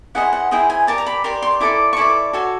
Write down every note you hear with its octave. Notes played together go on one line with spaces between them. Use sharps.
E4 G#4 C5 D#5 F#5
F#5
E4 G#4 C5 D#5 G5
G#5
G4 A#4 D5 A5
A#5
B5
G4 A#4 D5 C6
C6
E4 A4 D5 D6
C#6
E4 A4 D5 D6
F#4 A4 C#5